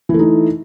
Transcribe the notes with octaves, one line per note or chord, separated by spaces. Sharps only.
E3 A3 D#4